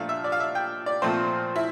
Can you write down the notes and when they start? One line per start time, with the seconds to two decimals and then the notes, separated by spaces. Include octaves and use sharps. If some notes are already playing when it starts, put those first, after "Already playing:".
Already playing: A#2 F3 A3 D4 F5
0.09 E5
0.24 D5
0.32 F5
0.40 E5
0.55 G5
0.86 D5
1.02 A#2 F3 A3 C4 C5
1.56 E4